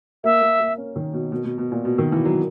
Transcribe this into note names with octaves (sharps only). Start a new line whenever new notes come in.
A#3 E5
A#3
A#3
C#4
D#3
B2
B2
B2
B2
A#2
B2
D#3
E3
F#3